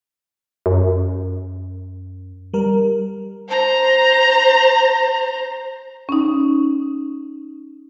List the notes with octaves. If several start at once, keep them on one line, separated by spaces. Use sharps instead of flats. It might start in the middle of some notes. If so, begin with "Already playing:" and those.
F#2
G3 A#4
C5 A#5
C#4 D#4